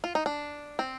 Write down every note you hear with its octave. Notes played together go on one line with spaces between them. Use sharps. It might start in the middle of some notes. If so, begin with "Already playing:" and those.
F4
D#4
D4
C4